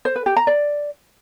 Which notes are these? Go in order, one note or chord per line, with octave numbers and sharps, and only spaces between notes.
C5
B4
G4
A#5
D5